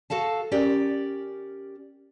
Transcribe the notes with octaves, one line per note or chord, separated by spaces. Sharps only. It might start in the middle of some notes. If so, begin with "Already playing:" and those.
F#4 A4 F5 A5
C#4 G4 A#4 D5